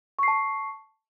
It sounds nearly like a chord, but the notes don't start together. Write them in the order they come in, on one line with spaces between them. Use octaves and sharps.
C#6 C7 A5